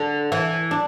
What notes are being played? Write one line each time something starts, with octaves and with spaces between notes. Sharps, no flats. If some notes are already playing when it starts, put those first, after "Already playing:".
Already playing: D3
E3
D4